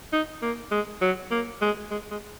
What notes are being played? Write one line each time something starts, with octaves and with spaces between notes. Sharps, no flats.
D#4
A#3
G#3
F#3
A#3
G#3
G#3
G#3